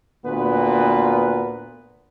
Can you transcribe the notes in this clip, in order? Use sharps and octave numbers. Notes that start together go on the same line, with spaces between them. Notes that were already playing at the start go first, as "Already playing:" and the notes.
D2 A#2 B3 B4